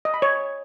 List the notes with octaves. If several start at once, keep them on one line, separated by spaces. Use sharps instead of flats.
D#5
B5
C#5